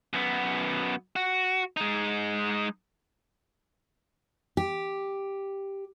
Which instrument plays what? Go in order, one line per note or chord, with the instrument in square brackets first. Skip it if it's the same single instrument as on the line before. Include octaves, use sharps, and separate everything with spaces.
[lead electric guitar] F#2 B3
F#4
G#3 D#4
[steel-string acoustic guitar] G4